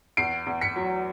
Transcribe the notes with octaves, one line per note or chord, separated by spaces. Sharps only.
E2 C7 D7
E2
B6 C#7
F#3